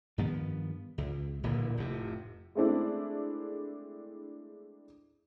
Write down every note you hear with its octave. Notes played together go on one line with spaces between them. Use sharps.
G2 D#3 F3 B3
C#2
D1 A#2 D3 E3
F1 A2 C3
G#3 A3 C4 D4 E4